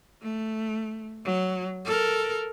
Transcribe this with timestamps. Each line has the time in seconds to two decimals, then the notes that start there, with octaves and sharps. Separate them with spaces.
0.22 A3
1.24 F#3
1.85 A4 A#4